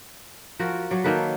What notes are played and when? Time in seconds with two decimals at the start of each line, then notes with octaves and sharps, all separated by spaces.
0.59 F3 F#4 A#4
0.90 F#3 C#5 D5
1.04 D#3 A#3 A4 B4